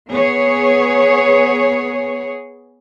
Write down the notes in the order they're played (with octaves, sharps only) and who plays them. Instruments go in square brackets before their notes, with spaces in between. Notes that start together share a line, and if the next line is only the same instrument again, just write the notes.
[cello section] B3 G#4 C#5